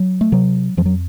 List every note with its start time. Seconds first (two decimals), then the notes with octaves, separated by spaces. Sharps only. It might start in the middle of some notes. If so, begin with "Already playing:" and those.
Already playing: F#3
0.21 A3
0.32 C3 F#3
0.77 F2 F3
0.85 F#3